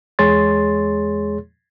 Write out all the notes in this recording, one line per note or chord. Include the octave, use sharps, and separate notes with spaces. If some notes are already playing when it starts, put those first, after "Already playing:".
E2 G#3 G#4 C#5 C6 A6